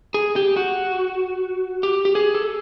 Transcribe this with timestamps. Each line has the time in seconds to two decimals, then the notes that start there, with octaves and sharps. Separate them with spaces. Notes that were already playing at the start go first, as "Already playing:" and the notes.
0.14 G#4
0.36 G4
0.57 F#4
1.83 G4
2.05 G4
2.15 G#4
2.35 A4